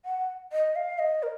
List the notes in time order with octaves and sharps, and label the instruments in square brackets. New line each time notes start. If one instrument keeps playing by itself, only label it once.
[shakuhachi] F#5
D#5
F5
D#5
A#4